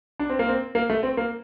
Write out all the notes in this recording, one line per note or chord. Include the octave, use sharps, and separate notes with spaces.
D4
C4
A#3
C4
A#3
A3
C4
A#3